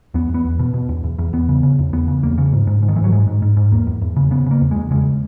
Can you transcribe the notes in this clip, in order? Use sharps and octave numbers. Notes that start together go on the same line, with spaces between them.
E2 B3
E2
B3
E2
B2
B2
E2
E2
E2
E2 B3
C#3
C#3
E2
E2 B3
C#3
E2 A#3
C#3
G#2
G#2
G#2
D#3
G#2 E3
F#3
G#2 G#3
G#2
G#2
G#2
E2 A#3
E2
E2
C#3
C#3 B3
C#3 A#3
E2
E2 G#3
C#3 G#3